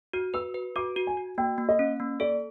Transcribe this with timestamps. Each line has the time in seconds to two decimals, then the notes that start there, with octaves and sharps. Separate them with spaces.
0.13 F#4 F6
0.34 B4 E6
0.54 B4
0.76 F#4 D6
0.96 F#4
1.07 G#5
1.17 F#4
1.38 A#3 G5
1.58 A#3
1.69 D#5
1.79 C#4
2.00 A#3
2.20 A4 D5